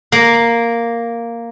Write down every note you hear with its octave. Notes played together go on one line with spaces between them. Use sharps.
A#3